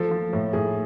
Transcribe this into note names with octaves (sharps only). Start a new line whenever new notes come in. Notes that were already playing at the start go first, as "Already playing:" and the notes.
Already playing: F3 A4
F3
A2
A2 G#4